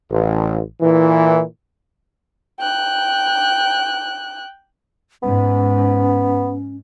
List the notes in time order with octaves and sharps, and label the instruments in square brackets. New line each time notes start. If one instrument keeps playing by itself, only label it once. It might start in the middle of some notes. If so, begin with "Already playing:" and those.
[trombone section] A1
A#2 E3
[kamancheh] G5 F#6
[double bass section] G#2 [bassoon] B3 [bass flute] C#4